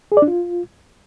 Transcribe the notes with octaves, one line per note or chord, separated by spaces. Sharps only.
G#4
D5
D4
F4